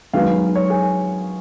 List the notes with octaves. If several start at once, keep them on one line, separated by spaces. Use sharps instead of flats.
F#2 D#3 G#3 B3 F5
C#5
G#4